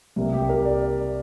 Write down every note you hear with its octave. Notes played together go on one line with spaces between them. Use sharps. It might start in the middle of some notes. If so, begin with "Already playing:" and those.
C2 C3 G3 A#3
G4
A#4
D5